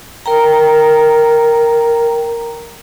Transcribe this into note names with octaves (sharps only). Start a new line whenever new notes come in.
A#4 G5 A#5